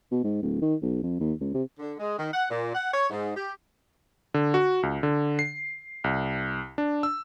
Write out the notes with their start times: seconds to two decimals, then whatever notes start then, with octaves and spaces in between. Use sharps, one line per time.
0.12 B2
0.24 G#2
0.42 D1
0.62 D#3
0.82 B1
1.03 F2
1.20 D#2
1.41 C#2
1.54 C3
1.79 D3
1.98 G#3
2.18 D#3
2.33 F#5
2.50 A#2
2.75 F#5
2.92 C#5
3.10 G#2
3.36 G4
4.34 D3
4.54 F#4
4.83 C#2
5.03 D3
5.39 C7
6.04 C2
6.78 D4
7.03 E6